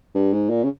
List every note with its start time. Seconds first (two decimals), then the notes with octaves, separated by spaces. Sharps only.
0.15 G2
0.33 G#2
0.50 A#2
0.63 C#3